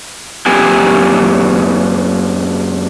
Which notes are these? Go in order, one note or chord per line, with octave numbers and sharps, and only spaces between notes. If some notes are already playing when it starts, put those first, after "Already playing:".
F#2 A#3 C4 G4 G5 G#5